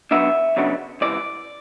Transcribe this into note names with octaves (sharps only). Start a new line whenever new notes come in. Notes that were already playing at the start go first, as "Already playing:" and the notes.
F#2 C#3 F#3 B3 D4 E5
F#2 C#3 F#3 B3 D4
C#2 C3 E3 D5